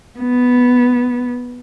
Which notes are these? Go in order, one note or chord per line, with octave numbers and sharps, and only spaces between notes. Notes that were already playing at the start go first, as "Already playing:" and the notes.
B3